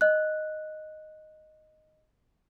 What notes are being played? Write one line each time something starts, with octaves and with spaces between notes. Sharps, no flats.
D#5 F#6